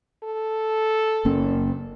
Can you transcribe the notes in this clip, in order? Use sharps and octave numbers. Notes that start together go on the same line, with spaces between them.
A4
F#1 A#3 C#4